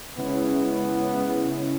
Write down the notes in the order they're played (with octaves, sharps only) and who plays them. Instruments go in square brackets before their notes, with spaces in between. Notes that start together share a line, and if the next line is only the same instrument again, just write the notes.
[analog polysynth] C#3 G#3 C#4 E4 [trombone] B3